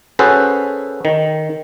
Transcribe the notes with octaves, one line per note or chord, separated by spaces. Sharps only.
C#4 F#4 G#4 A4 B4 C5
D#3